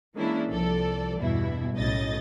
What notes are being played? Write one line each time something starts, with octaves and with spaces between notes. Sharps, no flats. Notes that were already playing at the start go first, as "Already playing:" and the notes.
E3 G#3 A#3 C#4 D4 E4
C2 F3 A4 D5
E2 G2 B2 E4
B1 A2 C#3 D#5 A6